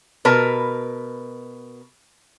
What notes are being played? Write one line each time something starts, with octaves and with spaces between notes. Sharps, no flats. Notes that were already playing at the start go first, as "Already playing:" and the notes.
B2 A#4 B4 A5